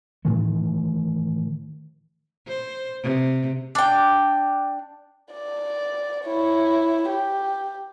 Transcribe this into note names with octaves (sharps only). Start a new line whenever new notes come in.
A2 D#3 E3 A3
C5
C3
D4 G5
D5
E4 C#5
G4